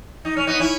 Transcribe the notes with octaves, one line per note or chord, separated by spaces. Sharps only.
D#4
C#4
B3 D#4
C#4 E4